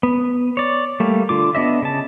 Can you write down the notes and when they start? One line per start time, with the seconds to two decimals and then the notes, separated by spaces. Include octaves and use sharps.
0.03 B3
0.57 C#5 D5
1.00 G3 A3 A#3
1.29 D3 F4 D6
1.55 B3 D4 D#5 E5
1.82 C#3 A5